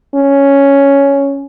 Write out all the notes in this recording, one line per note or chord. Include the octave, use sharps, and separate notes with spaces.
C#4